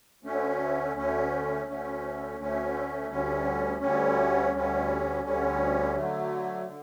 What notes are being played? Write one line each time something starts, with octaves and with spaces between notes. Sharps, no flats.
D2 D3 A3 C#4
D2 D3 A3 C#4
D2 D3 A3 C#4
D2 D3 A3 C#4
D2 D3 G3 C#4
D2 D3 G3 C#4
D2 D3 G3 C#4
D2 D3 G3 C#4
D3 F#3 A3
D3